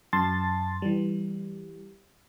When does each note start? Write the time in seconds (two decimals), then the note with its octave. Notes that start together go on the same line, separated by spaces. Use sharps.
0.13 F#2 A5 C6 A6
0.82 E3 G3